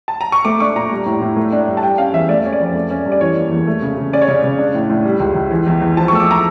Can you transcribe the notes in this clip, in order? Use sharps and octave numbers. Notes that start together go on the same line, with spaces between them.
A5
A#5
C#6
A3 D6
D4 C#6
A#2 A#5
G3
A2
A2
A3
D4
G2
A5
G3 G5
C#4 F5
E2 E5
A3 D5
C#4 C#5
D5
F2
A3
C#4
G2
D5
E3 C#5
A#3
E2
A3
C#3
C#3
C#4 D5
C#5
C#3 D5
C#3
D4
A2
A2
G3
C#2
C#2
E3
E2
E2
F3 A5
C#6
A3 E6
D6
A#5